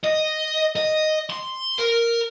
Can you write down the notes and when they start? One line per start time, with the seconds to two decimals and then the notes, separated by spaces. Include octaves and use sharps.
0.04 D#5
0.76 D#5
1.30 C6
1.79 A#4